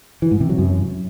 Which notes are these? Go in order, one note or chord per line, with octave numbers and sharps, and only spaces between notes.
E3
G#2
C3
F#3
F#2